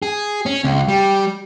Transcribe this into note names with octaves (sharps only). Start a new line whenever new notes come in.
G#4
C#4
C#2
G3